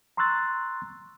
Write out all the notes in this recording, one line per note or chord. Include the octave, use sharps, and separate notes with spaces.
A#5 C6 C#6 E6 F#6 A6